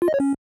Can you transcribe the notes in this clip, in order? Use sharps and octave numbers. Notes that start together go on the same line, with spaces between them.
F4
D#5
C#5
C#4